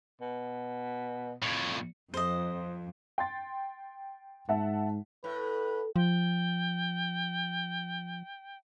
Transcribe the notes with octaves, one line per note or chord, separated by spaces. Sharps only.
B2
F2 A2
F2 C5 D#5
G5 C6 A6
G#2 E5 F#5 A5
A2 B4
F3 G5